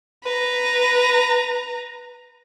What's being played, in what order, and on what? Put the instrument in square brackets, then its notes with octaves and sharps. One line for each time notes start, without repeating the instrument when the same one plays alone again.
[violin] B4 A#5